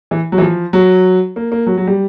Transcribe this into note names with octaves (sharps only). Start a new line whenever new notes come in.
E3
F#3
E3
F3
F#3
A#3
A#3
F#3
F#3
G3